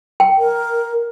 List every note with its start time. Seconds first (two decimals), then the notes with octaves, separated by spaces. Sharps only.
0.20 G5
0.38 A#4